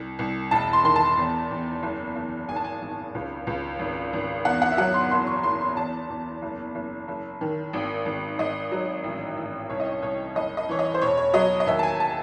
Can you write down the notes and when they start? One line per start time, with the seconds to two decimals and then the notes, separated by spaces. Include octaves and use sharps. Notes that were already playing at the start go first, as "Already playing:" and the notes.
Already playing: C2
0.19 C2
0.51 E1 A5
0.73 C6
0.84 D#3 C6
0.96 A5
1.17 E2
1.51 E2
1.83 F#1
2.15 F#1
2.48 G#1 G#5
2.56 A5
2.64 G#5
2.81 G#1
3.15 C#2
3.47 C#2
3.79 G#1
4.13 G#1
4.45 E2 F#5
4.62 F#5
4.72 E5
4.78 F#3 F#5
4.94 C6
5.11 F#1 C6
5.27 C#6
5.43 F#1 C6
5.61 C6
5.77 E2 A5
6.09 E2
6.42 F#1
6.75 F#1
7.08 F#1
7.41 D#3
7.73 G#1
8.06 G#1
8.39 G#1 D#5
8.72 F#3
9.04 A1
9.37 A1
9.70 C2 C#5
9.80 D#5
9.89 C#5
10.02 C2 C#5
10.35 F#1 D#5
10.57 D#5
10.69 E3 C#5
10.79 D#5
10.94 C5
11.02 E1 C#5
11.17 C#5
11.33 F#3 D#5
11.60 D#5
11.67 D#2 E5
11.79 A5
11.83 G#5
12.00 A5